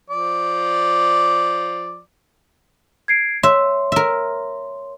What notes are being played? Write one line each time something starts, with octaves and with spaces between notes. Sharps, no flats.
F3 D5
G#6 C7 D7
C#5 E5 C6
A#4 E5